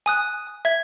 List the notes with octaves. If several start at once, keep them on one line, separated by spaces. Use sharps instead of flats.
G#5 D#6 F#6
E5 G#6